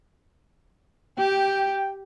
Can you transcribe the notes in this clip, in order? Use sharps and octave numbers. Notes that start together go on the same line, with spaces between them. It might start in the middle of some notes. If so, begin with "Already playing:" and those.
G4 G5